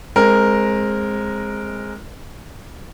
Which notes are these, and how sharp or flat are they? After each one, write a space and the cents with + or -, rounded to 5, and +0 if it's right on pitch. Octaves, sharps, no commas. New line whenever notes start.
G#3 +0 C4 +20 A#4 +0